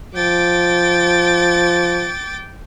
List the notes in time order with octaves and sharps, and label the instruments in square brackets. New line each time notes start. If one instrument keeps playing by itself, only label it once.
[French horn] F3 [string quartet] G5 D6 A6